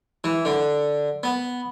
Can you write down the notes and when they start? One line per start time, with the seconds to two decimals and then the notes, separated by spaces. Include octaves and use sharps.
0.24 E3
0.45 D3
1.23 B3